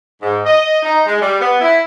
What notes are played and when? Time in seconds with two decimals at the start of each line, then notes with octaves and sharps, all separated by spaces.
0.23 G#2
0.45 D#5
0.83 D#4
1.06 G#3
1.21 G3
1.41 B3
1.61 E4